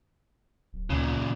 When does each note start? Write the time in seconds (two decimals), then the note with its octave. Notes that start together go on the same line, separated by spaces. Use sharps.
0.73 D1
0.90 D2 A#2 C#3